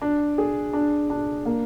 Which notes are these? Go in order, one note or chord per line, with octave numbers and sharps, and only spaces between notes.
D4
G#4
D4
D4
A#3